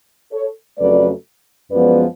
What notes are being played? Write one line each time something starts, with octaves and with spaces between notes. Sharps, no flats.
A4 C#5
F2 C#3 F#3 A3 B4 D5
F#2 F3 G#3 B3 B4 D5